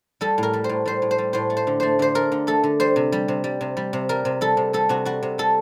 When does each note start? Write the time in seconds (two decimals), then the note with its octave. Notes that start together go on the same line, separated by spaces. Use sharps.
0.21 G3 A4
0.38 A2 A#4
0.53 G3
0.64 C5
0.69 A2
0.86 G3 C5
1.02 A2
1.11 C5
1.18 G3
1.33 A2 C5
1.50 A3
1.57 C5
1.67 D3
1.80 A3 C5
1.99 D3 C5
2.15 A3 A#4
2.32 D3
2.47 A3 A4
2.63 D3
2.80 G3 C5
2.96 C3
3.12 G3
3.28 C3
3.44 G3
3.61 C3
3.77 G3
3.93 C3
4.09 G3 A#4
4.25 C3
4.41 G3 A4
4.57 C3
4.73 G3 A4
4.89 C3 F#4
5.05 G3 F#4
5.23 C3
5.38 G3 A4